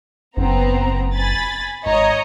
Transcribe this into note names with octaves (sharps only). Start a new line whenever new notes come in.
F#1 B3 C4 A#5
G#5 B5 A6
G#1 C#5 D#5 A#5